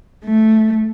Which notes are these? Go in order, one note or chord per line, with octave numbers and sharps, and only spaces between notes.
A3